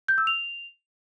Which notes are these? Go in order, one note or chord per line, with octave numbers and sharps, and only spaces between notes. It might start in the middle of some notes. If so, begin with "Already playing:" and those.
G6
E6
F7